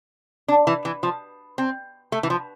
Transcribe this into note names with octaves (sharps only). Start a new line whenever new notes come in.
D4
E3
E3
F3
C4
A3
E3
F3